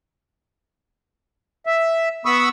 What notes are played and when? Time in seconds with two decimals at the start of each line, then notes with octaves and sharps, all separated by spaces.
1.66 E5
2.25 B3 B5 C#6 D#6 E6